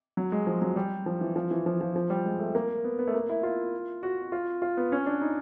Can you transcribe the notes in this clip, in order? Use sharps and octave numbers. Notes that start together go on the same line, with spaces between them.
F#3
G#3
F3
F#3
G3
F3
E3
F3
E3
F3
F3
F3
G3
G#3
A3
A#3
B3
B3
A3
A#3
E4
F4
F#4
F4
F4
B3
C#4
D4
D#4